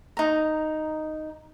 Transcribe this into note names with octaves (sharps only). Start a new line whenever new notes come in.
D#4 A#5